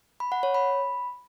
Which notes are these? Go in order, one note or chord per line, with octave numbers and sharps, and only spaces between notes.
B5
F#5
C#5
B5